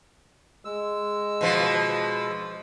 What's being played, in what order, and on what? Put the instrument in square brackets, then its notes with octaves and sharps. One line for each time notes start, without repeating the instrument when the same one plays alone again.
[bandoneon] G#3 E6
[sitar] B2 F3